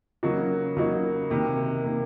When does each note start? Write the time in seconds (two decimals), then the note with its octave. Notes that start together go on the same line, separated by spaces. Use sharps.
0.23 C#3 F#3 A#3 D#4 F#4
0.77 C#3 F#3 A#3 D#4 F#4
1.30 C3 D#3 A#3
1.85 C3 D#3 A#3